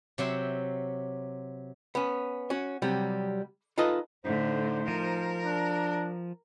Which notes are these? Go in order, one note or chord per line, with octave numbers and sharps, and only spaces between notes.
C3 F#3 E5 G5 C6
B3 C#4
C#4 F#4
C3 F#3 G3
D#4 F4 A4 B4 D#5
A2 D3 D#4 C5
F3 A#4
D4